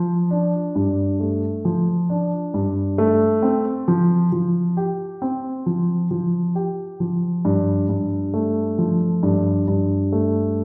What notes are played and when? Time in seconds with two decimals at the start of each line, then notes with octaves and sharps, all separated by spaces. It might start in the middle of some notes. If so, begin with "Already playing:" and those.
Already playing: F3
0.31 D4
0.75 G2
1.20 A3
1.65 F3
2.10 D4
2.54 G2
2.98 A3
3.43 C4
3.88 F3
4.32 F3
4.77 G4
5.22 C4
5.66 F3
6.11 F3
6.55 G4
7.00 F3
7.45 G2
7.89 G2
8.34 A3
8.78 F3
9.23 G2
9.68 G2
10.12 A3